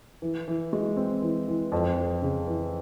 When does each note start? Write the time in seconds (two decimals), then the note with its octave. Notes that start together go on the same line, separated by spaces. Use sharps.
0.22 E3
0.48 E3
0.73 G#3
0.97 C4
1.22 E3
1.48 E3
1.72 F2
1.97 F2
2.22 C#3
2.47 E3